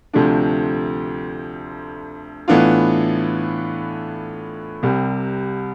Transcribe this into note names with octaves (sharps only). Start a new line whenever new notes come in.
D2 C3 F3 A3 D4
A2 E3 B3 D4 F4
C2 C3 G3